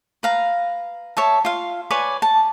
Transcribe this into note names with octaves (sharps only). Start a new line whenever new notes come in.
B4 F5 A#5
C#5 E5 A5
F4 F5
B4 C#5 D5 G#5
A5